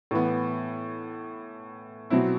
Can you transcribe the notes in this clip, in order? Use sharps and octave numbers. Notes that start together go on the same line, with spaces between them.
A2 E3 B3
B2 F#3 C4 E4